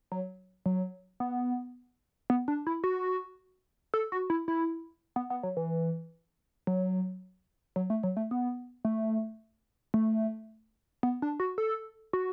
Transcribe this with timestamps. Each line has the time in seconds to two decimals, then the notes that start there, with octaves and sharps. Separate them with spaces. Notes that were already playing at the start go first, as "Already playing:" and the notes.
0.12 F#3
0.66 F#3
1.20 B3
2.30 B3
2.48 D4
2.67 E4
2.84 F#4
3.94 A4
4.12 F#4
4.30 E4
4.48 E4
5.16 B3
5.30 B3
5.43 F#3
5.57 E3
6.67 F#3
7.76 F#3
7.90 A3
8.03 F#3
8.17 A3
8.31 B3
8.85 A3
9.94 A3
11.03 B3
11.22 D4
11.40 F#4
11.58 A4
12.13 F#4